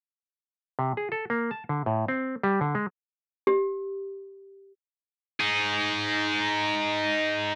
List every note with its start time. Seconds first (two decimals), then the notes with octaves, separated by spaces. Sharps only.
0.79 C3
0.97 G#4
1.12 A4
1.30 A#3
1.51 A5
1.69 D3
1.86 A2
2.08 C4
2.43 G3
2.61 D3
2.75 G#3
3.47 G4
5.40 D#4 G#4